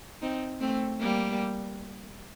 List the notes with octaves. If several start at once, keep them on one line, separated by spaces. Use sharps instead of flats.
C4 D#4
A3 C4
G3 A#3